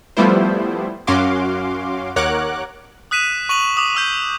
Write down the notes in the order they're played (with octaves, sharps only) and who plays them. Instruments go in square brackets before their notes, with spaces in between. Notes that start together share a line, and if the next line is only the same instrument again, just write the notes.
[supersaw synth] F3 G3 A3 B3 E4 C5
F#2 C#4 F#4 F5 C6 D6
D#2 A#4 C#5 F#5 D6 F#6
[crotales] D#6 F#6 B6 D#7 E7
C#6 D#7 F7 F#7
D6 D#6
C#6 E6 G6